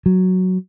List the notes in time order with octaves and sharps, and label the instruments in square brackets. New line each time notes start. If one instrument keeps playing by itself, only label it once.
[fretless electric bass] F#3